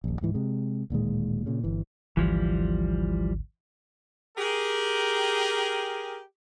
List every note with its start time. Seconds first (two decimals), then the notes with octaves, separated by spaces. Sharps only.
0.04 D#1 A#1
0.21 D1 G#2 E3
0.34 C3 G#3
0.90 D1 A#2 D#3 G#3
1.46 A#2 C#3
1.64 G1 E3
2.17 G#1 D2 E3 F3 G3
4.38 G4 G#4 A#4